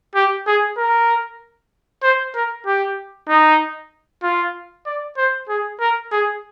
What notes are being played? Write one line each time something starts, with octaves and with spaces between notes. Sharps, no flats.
G4
G#4
A#4
C5
A#4
G4
D#4
F4
D5
C5
G#4
A#4
G#4